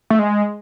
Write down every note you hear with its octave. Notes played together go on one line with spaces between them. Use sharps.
A3
G#3